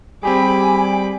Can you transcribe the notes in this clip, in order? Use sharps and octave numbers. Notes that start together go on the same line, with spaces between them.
G3 C4 G4 G#4 G#5 B5 D6